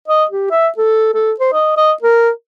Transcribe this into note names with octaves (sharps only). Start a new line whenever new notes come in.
D#5
G4
E5
A4
A4
C5
D#5
D#5
A#4